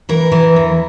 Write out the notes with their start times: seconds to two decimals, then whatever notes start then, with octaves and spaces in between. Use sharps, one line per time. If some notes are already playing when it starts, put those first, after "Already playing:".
0.09 E3 A#4
0.32 E3
0.56 E2